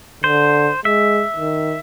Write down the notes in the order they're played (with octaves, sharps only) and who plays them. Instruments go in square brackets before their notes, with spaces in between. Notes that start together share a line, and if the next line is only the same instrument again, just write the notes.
[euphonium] D3 [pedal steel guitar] C5
[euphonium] G#3 [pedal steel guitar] E5
[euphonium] D#3